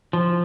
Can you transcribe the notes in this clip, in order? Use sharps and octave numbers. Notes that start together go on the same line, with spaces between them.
F3